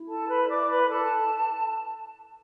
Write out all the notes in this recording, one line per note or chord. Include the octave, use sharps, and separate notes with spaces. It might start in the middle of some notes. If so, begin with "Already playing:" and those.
Already playing: E4
A4 A5
B4 B5
D5 D6
B4 B5
A4 A5